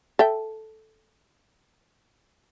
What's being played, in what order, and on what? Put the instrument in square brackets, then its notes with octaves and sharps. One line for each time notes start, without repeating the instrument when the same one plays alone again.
[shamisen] A4 E5 G5